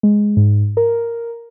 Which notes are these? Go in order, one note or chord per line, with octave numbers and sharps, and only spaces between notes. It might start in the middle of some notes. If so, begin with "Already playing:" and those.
G#3
G#2
A#4